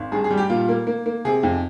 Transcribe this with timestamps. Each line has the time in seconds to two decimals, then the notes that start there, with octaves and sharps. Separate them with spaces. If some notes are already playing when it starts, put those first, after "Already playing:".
Already playing: G#1
0.12 G2 G#4
0.24 G#4
0.31 G3
0.37 G4
0.50 A#2 F4
0.69 A#3
0.87 A#3
1.06 A#3
1.25 C3 G#4
1.43 F2